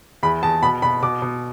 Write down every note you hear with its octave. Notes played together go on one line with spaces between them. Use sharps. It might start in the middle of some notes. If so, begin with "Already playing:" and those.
E2 B5
E2 A5
B2 B5
B2 B5
B2 D6
B2